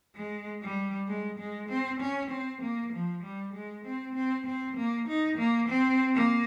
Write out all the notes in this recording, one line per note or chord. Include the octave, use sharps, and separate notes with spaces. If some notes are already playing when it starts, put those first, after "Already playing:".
G#3
G3
G#3
G#3
C4
C#4
C4
A#3
F3
G3
G#3
C4
C4
C4
A#3
D#4
A#3
C4
A#3